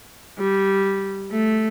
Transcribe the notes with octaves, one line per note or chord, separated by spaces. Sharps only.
G3
A3